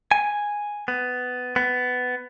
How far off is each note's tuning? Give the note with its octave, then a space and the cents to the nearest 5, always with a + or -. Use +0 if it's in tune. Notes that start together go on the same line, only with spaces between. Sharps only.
G#5 -5
B3 +15
B3 +15